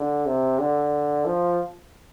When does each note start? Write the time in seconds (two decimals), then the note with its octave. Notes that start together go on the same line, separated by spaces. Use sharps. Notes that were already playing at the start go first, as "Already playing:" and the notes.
Already playing: D3
0.26 C3
0.59 D3
1.25 F3